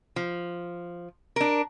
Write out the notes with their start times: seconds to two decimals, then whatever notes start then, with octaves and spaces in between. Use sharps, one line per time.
0.16 F3
1.36 D4 A#4